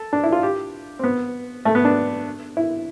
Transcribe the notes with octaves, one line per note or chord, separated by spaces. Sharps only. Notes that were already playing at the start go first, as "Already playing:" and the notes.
Already playing: A4
D4
E4
F4
G4
C4
B3
A3
B3
D4
E4